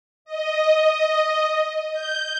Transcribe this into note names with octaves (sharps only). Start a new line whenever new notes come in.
D#5
G6